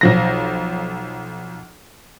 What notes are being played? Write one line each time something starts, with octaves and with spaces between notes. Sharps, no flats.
B1 F3 A#6